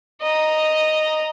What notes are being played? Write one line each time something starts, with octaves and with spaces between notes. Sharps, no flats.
D#5 A#5